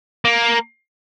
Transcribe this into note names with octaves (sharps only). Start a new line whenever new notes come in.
A#3